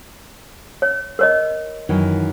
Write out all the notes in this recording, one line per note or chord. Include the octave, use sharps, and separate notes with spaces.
C#5
A#4 C#5 D#5
F#2 D#3 E3